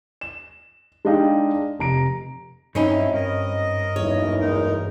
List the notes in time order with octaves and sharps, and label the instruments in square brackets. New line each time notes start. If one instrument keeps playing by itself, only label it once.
[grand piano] E7
G#3 D4 D#4 D#5 F5 G5
F1 A#5 D7
[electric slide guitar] G2 F#3 [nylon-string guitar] C4 C#4 D#4 [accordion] E4
[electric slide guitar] G2 [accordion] A#4 D#5
[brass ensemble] F#1 B1 E2 [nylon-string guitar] C#5
[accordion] G#3 D#4 A#4